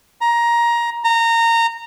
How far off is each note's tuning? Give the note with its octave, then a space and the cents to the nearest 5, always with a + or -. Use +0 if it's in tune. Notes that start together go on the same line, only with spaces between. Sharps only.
A#5 +15
A#5 -20